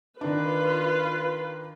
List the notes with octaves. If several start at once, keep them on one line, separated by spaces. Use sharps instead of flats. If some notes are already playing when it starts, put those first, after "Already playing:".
D#3 D4 F4 B4